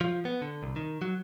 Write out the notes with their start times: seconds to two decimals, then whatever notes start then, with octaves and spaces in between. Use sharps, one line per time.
0.01 F3
0.25 B3
0.42 D3
0.63 C2
0.76 D#3
1.02 F#3